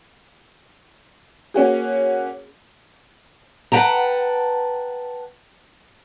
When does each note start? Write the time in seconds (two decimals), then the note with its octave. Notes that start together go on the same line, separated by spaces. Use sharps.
1.54 A#3 C#4 F#4 G#4
3.72 B4 F#5 G5 A5 A#5